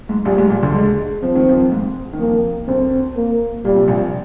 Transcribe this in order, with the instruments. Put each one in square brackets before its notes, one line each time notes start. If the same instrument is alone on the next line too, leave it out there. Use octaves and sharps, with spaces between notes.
[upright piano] G#2
[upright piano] A#1 A#2 [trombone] G3
[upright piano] G#2
A#1 A#2
D2 D3
[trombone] G#3
[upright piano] F3 [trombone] C4
[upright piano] D#3
F2 F3
G#2 G#3
D#3
[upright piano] F2 F3 [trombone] A#3
[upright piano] D2 D3 [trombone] C4
[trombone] A#3
[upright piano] A#2 [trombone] G3
[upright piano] C3
A#1 A#2